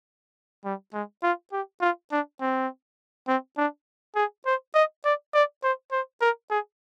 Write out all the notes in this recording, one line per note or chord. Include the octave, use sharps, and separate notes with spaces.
G3
G#3
F4
G4
F4
D4
C4
C4
D4
G#4
C5
D#5
D5
D5
C5
C5
A#4
G#4